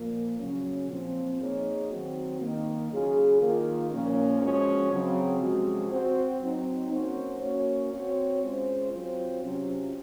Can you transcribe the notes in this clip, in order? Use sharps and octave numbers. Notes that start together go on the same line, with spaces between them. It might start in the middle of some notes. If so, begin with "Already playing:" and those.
Already playing: A#2 F3 A#3
C#3 F#3 C#4
A#2 F3 C4
A#3 D#4 G#4 C#5
D#3 F#3 C4 F#4
D#3 A#3 D#4
C#3 F#3 C#4 F4 G#4
D#3 A#3 F4 A#4
A#2 F3 A#3 C#4
F3 G#3 C#4 F#4 C#5
C#3 F#3 C4
C3 F3 G#3 C#4 F#4
C4 F#4 C5
F#3 C4 D#4
F#3 A#3 C#4 F#4 C5
A#3 C#4 F#4 C#5
C4 F#4 C#5
G#3 C#4 F4 C5
F#3 C4 F4 C5
C3 F#3 C#4 F4